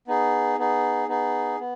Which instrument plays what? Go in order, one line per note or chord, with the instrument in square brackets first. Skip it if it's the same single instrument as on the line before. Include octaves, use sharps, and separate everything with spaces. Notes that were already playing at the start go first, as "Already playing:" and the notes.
[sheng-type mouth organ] B3 D#4 G#4
B3 D#4 G#4
B3 D#4 G#4
B3